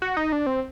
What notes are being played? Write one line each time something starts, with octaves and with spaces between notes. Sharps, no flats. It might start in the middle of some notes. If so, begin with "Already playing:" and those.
F#4
D#4
D4
C4